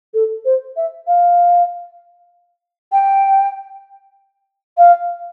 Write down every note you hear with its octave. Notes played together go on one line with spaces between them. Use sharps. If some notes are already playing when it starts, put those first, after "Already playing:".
A4
C5
E5
F5
G5
F5